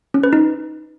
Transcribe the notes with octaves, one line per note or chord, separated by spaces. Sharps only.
C#4
B4
D#4